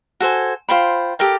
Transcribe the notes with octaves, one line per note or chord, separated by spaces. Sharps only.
F#4 A4 C5 G#5
F4 C5 G5 B5
G4 A4 A#4 G5